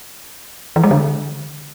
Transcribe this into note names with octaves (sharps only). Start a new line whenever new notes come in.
E3
G#3
D3